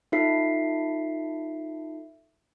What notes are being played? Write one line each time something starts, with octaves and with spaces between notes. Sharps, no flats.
D#4 F4 A4 E5 B6 C7